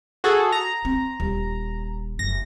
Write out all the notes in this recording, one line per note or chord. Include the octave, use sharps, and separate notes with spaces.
F#4 G#4 A4
A#5
C4
D#1
F#1 A#6